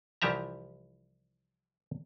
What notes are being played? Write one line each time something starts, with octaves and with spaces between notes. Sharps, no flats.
C2 E3 F3 G4 E5 A#5